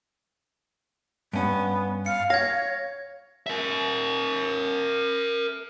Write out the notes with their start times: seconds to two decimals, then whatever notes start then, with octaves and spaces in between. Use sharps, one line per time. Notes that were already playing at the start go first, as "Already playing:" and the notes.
1.33 G2 B3 C#4
2.06 F5 C#7
2.30 C#5 F5 G#6 A#6
3.47 A#4 E5